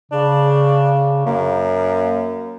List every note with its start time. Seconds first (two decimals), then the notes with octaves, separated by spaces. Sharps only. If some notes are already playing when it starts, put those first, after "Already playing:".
0.12 C#3 D4
1.26 F#2 A#3